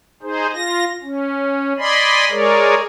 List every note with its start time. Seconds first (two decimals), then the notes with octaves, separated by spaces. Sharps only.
0.22 D#4 G#4 C5
0.54 F4 A#6
1.03 C#4
1.78 D5 D#5 G#5 B5 C6
2.30 G#3 G#4 A#4 C#5 D5